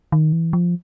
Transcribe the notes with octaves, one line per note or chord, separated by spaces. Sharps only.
D#3
E3
F3